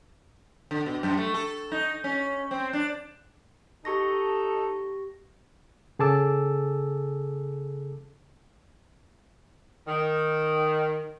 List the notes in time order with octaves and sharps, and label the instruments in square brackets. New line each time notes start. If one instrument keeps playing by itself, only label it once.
[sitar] D3
B2
F#2
A3
A4
D#4
C#4
C4
D4
[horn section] D#4 A4 [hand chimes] G4 C#6 A#6
[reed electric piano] C#3 G#4 A4 A5 D6 E6
[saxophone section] D#3